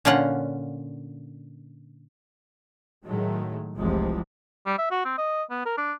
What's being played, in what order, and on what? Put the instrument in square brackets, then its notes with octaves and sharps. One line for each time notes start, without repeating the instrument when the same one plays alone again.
[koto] A#2 D3 C#4 F4 F#5
[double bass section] A2 D#3 F#3 G#3 A3
F1 C2 C3 E3 F3 G#3
[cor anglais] G3
E5
F#4
C4
D#5
B3
A#4
D4